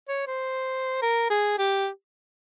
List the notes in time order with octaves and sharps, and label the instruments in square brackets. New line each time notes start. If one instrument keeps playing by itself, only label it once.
[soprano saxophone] C#5
C5
A#4
G#4
G4